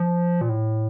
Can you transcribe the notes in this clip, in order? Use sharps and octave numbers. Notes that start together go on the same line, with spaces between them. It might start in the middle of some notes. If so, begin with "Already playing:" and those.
Already playing: F3
A#2
A2